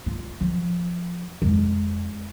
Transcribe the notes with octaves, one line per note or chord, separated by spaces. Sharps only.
F4
F3
F2 G#3